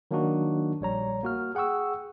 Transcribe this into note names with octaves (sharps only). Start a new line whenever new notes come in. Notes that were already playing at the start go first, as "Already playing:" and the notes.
D#3 F#3 A#3 D4 D#4 F#4
A#1 G3 C#5 A#5
A#3 F#4 F6
G#4 F#5 G5 C#6 E6